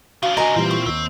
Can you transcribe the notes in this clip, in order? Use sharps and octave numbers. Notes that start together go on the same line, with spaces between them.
C#3 D4 F#4 F5 C6 D#6
A#4 D#5 F5 G#5
A#2 E3 G3 C4 E4 F4
C#6
D#2 C4